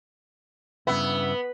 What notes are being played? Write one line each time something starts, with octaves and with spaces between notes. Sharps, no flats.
G2 C#3 B3 E4